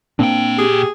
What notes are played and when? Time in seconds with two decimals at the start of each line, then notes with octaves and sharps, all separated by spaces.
0.19 A#2 A#3 C4 D4 G5
0.59 G4 G#4